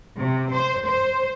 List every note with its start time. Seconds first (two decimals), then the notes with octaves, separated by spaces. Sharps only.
0.17 C3
0.53 C5
0.87 C5